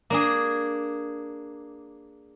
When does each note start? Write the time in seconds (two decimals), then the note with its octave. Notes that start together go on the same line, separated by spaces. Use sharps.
0.10 A#3 D4 G#4